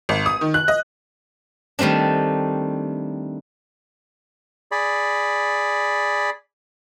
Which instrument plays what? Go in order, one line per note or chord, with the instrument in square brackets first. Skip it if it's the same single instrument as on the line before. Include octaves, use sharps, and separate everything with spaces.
[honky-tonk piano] G#1
D#6
D#3
F#6
D#5
[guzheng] D#3 G3 A3 C4 D4
[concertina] G#4 D5 B5